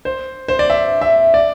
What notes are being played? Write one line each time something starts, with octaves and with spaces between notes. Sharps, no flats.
C5
C5
D5
E5
E5
D5